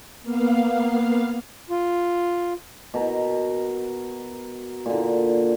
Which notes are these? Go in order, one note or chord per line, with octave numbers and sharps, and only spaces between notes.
A#3 B3 F5
F4
B2 A#4
A#2 D3